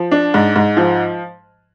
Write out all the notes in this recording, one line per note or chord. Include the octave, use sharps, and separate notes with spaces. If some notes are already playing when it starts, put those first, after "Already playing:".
Already playing: F3
D4
G#2
G#2
F3